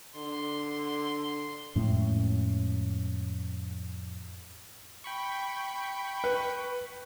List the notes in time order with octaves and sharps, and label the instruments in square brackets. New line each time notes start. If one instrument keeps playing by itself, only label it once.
[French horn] D3 [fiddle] C6
[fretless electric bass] F2 A2 G#3 C#4
[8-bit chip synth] G5 B5 C#6
[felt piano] B4